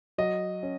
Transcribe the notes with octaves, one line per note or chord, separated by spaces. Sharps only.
F#3 D#5
C#4